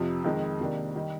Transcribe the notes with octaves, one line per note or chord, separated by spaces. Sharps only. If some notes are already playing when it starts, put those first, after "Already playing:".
Already playing: F2 C3 F3
F2 D#3 G#3 D#4
C3 D#3 A#3 D4
D#3 G3